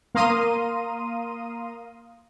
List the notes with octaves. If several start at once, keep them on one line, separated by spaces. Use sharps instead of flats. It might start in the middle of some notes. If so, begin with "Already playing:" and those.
A#3 F5 A#5 C6 D#6 D#7